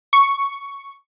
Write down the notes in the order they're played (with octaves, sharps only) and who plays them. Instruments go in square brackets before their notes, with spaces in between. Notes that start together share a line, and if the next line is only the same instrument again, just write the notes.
[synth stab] C#6